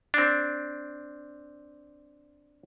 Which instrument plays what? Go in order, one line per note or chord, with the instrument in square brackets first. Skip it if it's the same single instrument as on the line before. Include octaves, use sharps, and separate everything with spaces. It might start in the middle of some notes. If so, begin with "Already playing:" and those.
[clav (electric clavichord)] C4 D4